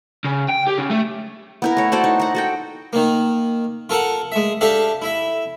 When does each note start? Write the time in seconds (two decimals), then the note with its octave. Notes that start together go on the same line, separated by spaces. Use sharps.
0.24 C#3
0.48 G5
0.67 G4
0.78 C#3
0.90 A3
1.62 B3 E4 A#4
1.77 A3 C#5
1.92 F#4 A4 C5 D5
2.04 D#4
2.20 A#4 F#5
2.35 F#4 A4 G5
2.93 D#3 A#3
3.89 F4 A4 A#4 F#5
4.32 G#3 E5
4.61 D4 G4 A4 E5 F5
5.02 E4 E5